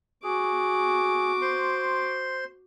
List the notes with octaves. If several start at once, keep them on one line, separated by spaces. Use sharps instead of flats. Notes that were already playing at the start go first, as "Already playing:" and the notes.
F#4 G#4 D6
C5 C6